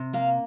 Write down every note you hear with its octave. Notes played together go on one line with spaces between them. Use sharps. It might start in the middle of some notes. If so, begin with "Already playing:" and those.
Already playing: C3
A#3 F5